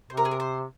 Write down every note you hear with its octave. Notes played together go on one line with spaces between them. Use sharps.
C3 C5
A#4
G#4
A#4
C5